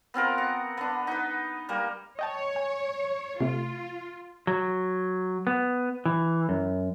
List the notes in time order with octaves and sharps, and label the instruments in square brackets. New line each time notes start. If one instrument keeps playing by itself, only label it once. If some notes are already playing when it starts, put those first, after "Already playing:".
[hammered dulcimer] B3 C4 F4 A#4
F#5
B3 D4
D#4 B4
G3 A#3
[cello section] C#5 [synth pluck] D#5 G5 A5
[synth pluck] G#5
[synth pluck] C3 A3 [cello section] F4
[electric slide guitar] F#3
B3
E3
F#2